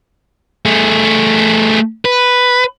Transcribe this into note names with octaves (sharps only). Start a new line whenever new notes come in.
A3 G#4
B4